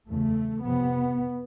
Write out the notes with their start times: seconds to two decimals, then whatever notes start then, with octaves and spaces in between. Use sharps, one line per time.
0.09 E2 C#3 A3
0.64 F2 C3 B3